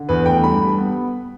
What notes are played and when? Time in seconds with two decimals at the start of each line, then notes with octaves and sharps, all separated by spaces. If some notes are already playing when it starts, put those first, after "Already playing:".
Already playing: D3
0.09 E2 B4
0.26 A3 G5
0.43 G2 B5
0.61 G2
0.78 B3